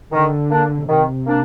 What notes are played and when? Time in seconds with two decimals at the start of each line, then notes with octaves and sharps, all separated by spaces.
0.11 D3 D#3
0.50 A#3 D4
0.88 C3 D#3
1.27 A#3 D4